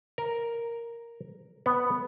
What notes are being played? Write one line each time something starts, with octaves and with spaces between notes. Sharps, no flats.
A#4
B3